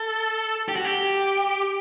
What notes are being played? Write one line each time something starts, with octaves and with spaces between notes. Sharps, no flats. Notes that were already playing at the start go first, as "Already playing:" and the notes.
Already playing: A4
G4
F#4
G4